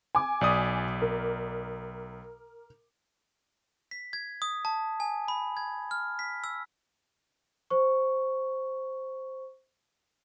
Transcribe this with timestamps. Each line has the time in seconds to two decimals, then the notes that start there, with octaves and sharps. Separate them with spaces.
0.15 G#5 D6
0.41 B1 D5 D#6
1.02 A#4
3.91 B6
4.13 G#6
4.42 D#6
4.65 A5
5.00 G#5
5.28 B5
5.57 G#6
5.91 F6
6.19 B6
6.44 E6
7.70 C5 C#6